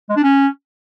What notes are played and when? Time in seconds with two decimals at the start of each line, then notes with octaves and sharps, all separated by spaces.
0.10 G#3
0.16 D4
0.23 C#4